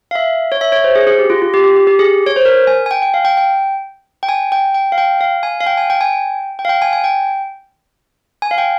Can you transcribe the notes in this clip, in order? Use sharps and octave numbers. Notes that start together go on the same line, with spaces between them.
F5
E5
C#5
E5
C#5
C5
G#4
G#4
G4
F4
F4
G4
G4
G4
G4
G#4
C#5
C5
A#4
G#5
G#5
G5
G5
F5
G5
G5
G5
G#5
G5
G5
F5
G5
F5
G#5
F5
G5
G#5
G5
G#5
G5
G5
F5
G5
G#5
G#5
G5
G#5
F5
G5